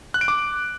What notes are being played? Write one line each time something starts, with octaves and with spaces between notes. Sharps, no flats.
F#6
D7
D6